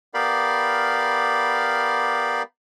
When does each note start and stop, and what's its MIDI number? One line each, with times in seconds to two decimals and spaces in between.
0.14 2.42 59
0.14 2.42 67
0.14 2.42 70
0.14 2.42 74
0.14 2.42 77
0.14 2.42 83